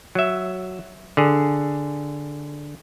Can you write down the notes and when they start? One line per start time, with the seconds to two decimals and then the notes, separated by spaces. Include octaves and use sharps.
0.15 F#3 E5
1.17 D3 G#4